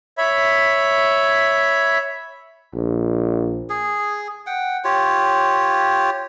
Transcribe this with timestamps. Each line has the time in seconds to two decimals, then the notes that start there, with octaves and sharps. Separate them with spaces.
0.18 C#5 E5 B5
2.75 A#1
3.70 G#4
4.47 F#5 G5
4.84 F4 G4 C#5